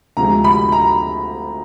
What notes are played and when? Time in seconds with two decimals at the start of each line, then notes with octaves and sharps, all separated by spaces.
0.17 D2 C3 F3 G#3 A#5
0.44 B5
0.72 A#5